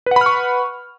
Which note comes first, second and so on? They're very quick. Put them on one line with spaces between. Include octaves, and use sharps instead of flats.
B4 F#5 B5 F6 C#6